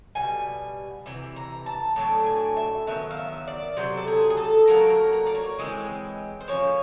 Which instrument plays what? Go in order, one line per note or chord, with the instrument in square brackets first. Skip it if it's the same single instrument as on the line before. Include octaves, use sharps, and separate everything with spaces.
[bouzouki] B2 G3 G#5
C3 E3
A#5
A5
A2 F#3 D4
G#5
E5
D#3 F#3 B3 E5
F5
E5
D5
C3 D#3 F#3 C5
A4
G#4
G#4
A4
A2 F#3 A#3 A#4
A#4
A#4
D5
C#5
E3 G#3 C4
C5
F3 A#3 C#4 C#5